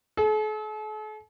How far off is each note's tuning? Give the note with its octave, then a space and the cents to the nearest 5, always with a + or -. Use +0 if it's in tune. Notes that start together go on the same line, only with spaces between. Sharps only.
A4 -45